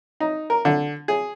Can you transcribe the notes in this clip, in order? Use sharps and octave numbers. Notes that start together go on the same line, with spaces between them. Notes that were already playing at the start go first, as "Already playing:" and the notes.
D#4
A#4
D3
G#4